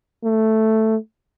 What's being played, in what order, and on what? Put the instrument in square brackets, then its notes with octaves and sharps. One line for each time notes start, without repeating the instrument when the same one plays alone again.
[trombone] A3